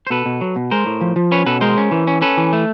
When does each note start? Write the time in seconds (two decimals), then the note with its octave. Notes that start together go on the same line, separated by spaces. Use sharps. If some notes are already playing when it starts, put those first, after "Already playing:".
0.07 C5
0.10 B2 A4 B4
0.26 B2
0.41 F#3
0.56 B2
0.71 G#3 A#4 C5
0.86 A2
1.01 F3
1.16 F3
1.31 C#4 B4 C#5
1.46 B2 A4 B4
1.61 G#3 A#4 C5
1.77 C#4
1.91 E3
2.07 C#4
2.21 C#4 A4 B4
2.37 E3
2.53 A3